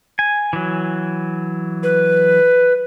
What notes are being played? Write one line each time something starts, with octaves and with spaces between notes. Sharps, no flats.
G#5
E3 F#3
B4